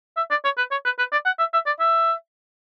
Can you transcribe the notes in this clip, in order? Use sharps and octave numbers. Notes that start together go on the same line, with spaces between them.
E5
D5
C#5
B4
C#5
B4
B4
D5
F#5
E5
E5
D5
E5